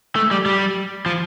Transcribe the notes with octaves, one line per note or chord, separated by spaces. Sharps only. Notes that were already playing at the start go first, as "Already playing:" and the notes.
A3
G3
G3
F3